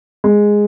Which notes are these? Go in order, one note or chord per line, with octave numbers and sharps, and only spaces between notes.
G#3